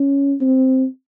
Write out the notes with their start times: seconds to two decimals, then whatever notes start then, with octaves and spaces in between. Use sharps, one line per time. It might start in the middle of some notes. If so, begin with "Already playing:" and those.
Already playing: C#4
0.41 C4